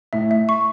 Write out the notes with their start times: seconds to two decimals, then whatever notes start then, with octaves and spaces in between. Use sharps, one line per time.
0.13 A2 E5
0.31 E5
0.49 C#6